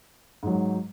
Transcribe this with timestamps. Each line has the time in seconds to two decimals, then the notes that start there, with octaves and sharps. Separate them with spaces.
0.43 G#2 F#3